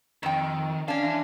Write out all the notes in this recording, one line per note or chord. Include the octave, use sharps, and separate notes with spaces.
F2 D#3 G5
C#4 D4 F5
E3